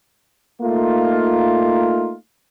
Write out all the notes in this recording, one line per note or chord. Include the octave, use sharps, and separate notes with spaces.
A3 A#3 D#4 F4